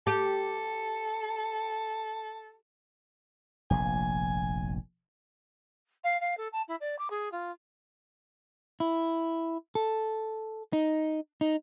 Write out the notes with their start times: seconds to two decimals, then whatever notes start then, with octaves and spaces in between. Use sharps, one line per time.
0.07 G4 A4
3.70 F1 A#1 A#2 G#5
6.04 F5
6.21 F5
6.37 A4
6.53 A5
6.68 E4
6.80 D5
6.99 D6
7.10 G#4
7.32 F4
8.80 E4
9.75 A4
10.73 D#4
11.41 D#4